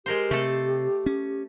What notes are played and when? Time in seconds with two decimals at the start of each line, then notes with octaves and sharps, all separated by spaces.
0.06 G#3 G4 A#4 C5
0.31 C3 A3 A4
1.06 C#4